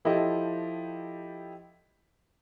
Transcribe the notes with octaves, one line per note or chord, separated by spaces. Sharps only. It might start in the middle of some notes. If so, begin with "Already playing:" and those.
F3 E4 G4 A4 D#5